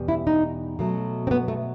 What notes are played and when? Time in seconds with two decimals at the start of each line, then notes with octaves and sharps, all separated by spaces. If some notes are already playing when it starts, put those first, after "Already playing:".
Already playing: E2 B2 G3
0.08 E4
0.27 D#4
0.79 B2 F#3 A3
1.27 C4
1.31 B3
1.48 A3